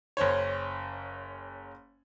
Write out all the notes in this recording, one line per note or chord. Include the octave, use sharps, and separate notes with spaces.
F#1 C#4 C5 C#5